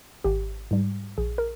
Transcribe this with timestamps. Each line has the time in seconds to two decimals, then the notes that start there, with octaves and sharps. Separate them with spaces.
0.24 G#1 G4
0.71 G#2 G3
1.18 A#1 G#4
1.38 A#4